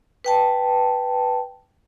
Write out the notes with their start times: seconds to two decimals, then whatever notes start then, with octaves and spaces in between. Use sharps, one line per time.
0.24 B4 G5 A5